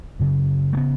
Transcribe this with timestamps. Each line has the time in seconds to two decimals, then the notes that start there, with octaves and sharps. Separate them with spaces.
0.20 F#2 C#3
0.73 A3
0.77 C#3 B3